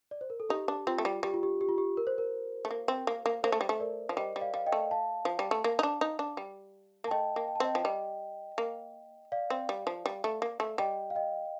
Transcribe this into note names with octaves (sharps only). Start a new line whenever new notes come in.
D5
C5
A#4
A4
D#4 G4
D4
C4 F4
A3
G3
G3 G4
F4
G4
G4
F4
G4
A#4
C5
A#4
A3
A#3
C4
A#3
A#3
A#3 C5
A3
G3
A3
A#4 D5
F3
G3 C5 D#5
G3
D5 F5
G3 F5
D#5 G5
A3
F5 A5
F3
G3
A3
A#3
D#4
D4
D#4
D4
G3
A#3
A5
A3 D#5 G5
A#3
G5
A5
C4 D#5 G5
F3
G3 D#5 G5
A#3
D5 F5
C4
G3
F3
G3
A3
A#3
A3
G3 D#5 G5
F5
D#5 G5